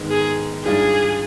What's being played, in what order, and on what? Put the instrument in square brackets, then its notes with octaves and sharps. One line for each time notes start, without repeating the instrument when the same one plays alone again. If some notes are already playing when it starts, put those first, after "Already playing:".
Already playing: [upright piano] G#2 D#3 G#3 B3
[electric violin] G#4
[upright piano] G#2 G3 D4 F4 [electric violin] G#4